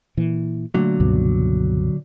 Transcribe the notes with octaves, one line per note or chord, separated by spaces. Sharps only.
A#2 E3
A#2 D3 F#3 A3
C#2 G2 B2